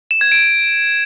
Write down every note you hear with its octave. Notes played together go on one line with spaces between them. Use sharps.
E7
G#6
D7